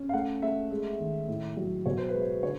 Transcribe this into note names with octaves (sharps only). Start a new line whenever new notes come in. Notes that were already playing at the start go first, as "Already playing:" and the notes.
Already playing: C#4
F5
A3 F#5
A3 E5
G#3
D#3
A2
F#3
B2 C#5
C5
B4
G#3
C5
D3 C#5